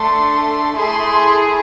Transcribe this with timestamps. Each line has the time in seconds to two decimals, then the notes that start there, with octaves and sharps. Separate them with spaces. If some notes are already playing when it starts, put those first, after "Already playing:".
Already playing: A3 D4 A4 C6
0.76 A3 E4 G#4 C6